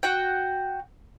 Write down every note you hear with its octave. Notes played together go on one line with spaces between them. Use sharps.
F#4 F#5 G5